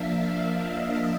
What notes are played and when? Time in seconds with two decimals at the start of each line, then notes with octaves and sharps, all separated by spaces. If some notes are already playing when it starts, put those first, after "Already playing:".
Already playing: F3 A#3 D4 E5 F5
0.15 E5
0.44 D#5